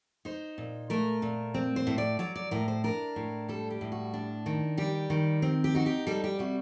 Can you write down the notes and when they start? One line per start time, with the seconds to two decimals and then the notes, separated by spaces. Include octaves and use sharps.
0.25 D#4 C5
0.58 A#2
0.90 A3 A#4
1.22 A#2
1.54 C4
1.76 C5
1.87 A2
1.98 D5
2.19 F#3 D5
2.36 D5
2.51 A2 A#4
2.68 C5
2.84 D4 A#4
3.16 A2
3.49 G3 A4
3.71 G4
3.81 A2
3.92 F#4
4.14 D4
4.46 D#3
4.77 G3 G4
5.10 D#3
5.42 C4
5.64 G4
5.75 D#4 F#4
5.86 G4
6.07 G3 A4
6.24 G4
6.39 C3 F#4